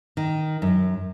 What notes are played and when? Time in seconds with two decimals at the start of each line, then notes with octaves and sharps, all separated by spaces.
0.17 D#3
0.62 F#2